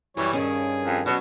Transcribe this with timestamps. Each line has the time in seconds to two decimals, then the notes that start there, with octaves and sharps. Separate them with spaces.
0.17 F#2 E3 G3 C#5
0.33 G2 D#3 C#4 G#4
0.85 F2
1.06 B2 F#3 C#4 F#4